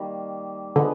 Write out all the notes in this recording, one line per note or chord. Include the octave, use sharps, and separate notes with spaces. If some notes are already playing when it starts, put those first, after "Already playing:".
Already playing: D#3 G3 A#3
D3 F3 G#3 B3